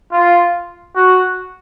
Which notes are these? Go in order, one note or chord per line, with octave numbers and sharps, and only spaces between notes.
F4
F#4